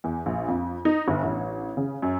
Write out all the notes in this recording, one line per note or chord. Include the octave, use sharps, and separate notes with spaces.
E2
A#1
F2
D#4
G1
A1
C#3
F#2